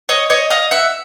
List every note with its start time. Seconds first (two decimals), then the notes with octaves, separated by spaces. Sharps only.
0.09 C#5 D#5
0.30 C#5 D#5
0.50 D#5 F5
0.71 E5 F#5